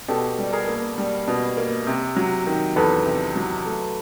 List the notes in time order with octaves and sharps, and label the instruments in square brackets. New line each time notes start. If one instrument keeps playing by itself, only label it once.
[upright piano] B2 G4 A4
G3
G#4 A#4
A#3
G3
B2
A#3
C3
F#3
D#3
E2 A4 B4
C3
F#3
A3